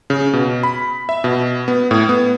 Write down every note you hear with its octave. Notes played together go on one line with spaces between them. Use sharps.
C#3
B2
B5
E5
B2
B3
A2
B3